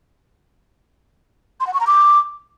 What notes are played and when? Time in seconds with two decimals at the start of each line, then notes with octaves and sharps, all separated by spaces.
1.60 C6
1.67 F#5
1.73 C#6
1.80 A#5
1.87 D6